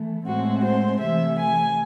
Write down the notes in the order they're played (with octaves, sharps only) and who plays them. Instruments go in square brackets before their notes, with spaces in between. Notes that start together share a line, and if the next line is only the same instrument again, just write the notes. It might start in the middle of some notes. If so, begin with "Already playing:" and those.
Already playing: [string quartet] E3 A3
A2 G#3 C4 F#4
C5
C3 E3 A3 E5
G#5